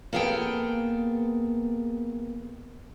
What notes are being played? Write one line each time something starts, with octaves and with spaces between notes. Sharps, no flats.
A#3 B3 G#4 A4 G5